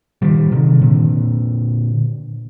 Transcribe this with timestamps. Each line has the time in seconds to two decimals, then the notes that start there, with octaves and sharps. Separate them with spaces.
0.22 D#3 G3
0.52 C3 D#3
0.82 A#2 D3